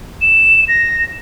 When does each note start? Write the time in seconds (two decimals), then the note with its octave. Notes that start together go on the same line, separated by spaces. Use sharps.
0.22 E7
0.68 A#6